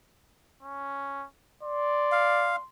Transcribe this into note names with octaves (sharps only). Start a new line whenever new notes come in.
C#4
D5 C6
F5